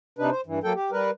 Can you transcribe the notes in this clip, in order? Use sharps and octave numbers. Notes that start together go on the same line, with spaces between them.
C3 D4 D#4 B4
C5
G2 E3
F#3 A#3 A4 G5
G4
G3 A#4 B4